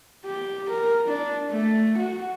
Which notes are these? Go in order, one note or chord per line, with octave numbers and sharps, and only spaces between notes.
G4
A#4
D4
A3
F#4